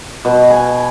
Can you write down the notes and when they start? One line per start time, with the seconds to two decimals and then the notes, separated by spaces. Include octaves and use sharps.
0.25 B2
0.50 G#5